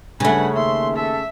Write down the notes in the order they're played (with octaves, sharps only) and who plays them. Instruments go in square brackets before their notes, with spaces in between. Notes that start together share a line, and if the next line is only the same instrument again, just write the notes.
[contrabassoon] G2 [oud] C#3 A3 [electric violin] B4 F#5 [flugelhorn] G#5
[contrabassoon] D#2 [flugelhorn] E5 [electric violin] C6
[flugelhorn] A4 [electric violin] E5